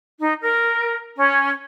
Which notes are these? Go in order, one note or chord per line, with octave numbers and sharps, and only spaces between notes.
D#4
A#4
C#4